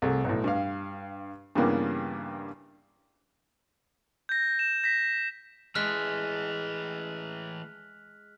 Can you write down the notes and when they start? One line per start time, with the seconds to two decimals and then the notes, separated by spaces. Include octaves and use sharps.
0.02 C2 A3 G#4
0.24 B1 A2
0.44 G2 F5
1.55 G2 C#3 E3 G3 A#3 B3
4.29 G6 A#6
4.59 E7
4.84 A#6 B6
5.75 E3 G#3 A3 F6 F#6 B6